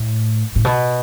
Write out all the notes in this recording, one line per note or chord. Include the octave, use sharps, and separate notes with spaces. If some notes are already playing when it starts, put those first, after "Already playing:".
Already playing: A2
A2
B2